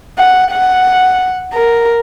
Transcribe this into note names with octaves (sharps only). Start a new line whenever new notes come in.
F#5
F#5
A#4